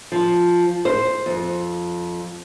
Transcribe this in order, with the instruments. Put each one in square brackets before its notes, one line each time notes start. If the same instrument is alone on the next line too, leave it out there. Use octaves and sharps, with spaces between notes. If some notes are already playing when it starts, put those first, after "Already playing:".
[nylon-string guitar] F3
C5
F2